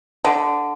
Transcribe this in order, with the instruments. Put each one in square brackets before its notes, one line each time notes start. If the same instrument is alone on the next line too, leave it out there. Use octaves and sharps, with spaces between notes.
[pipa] D3